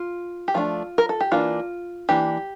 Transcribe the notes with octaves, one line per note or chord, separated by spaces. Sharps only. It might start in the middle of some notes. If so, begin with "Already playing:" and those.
Already playing: F4
G4
F3 A3 D4 F4
A#4
A4
G4
E3 A#3 D4 F4
E3 A#3 D4 G4